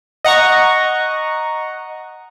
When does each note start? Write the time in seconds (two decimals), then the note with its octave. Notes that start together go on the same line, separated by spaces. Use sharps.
0.25 D#5 F#5 A#5 C#6